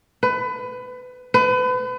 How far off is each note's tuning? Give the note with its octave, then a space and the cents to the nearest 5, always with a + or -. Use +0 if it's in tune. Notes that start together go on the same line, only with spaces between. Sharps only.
B4 +25
B4 +35